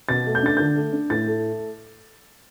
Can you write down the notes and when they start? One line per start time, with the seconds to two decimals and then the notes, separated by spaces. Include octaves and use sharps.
0.09 B2 A6
0.27 A3
0.35 G6
0.43 D4 A6
0.57 D3 G6
0.76 A3
0.93 D4
1.10 A2 A6
1.27 A3